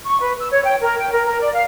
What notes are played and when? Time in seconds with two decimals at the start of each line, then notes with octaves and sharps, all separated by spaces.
0.05 C#6
0.21 B4
0.40 E6
0.51 C#5
0.65 G5
0.81 A#4
0.99 G5
1.12 A#4
1.27 A#4
1.41 D5
1.53 F5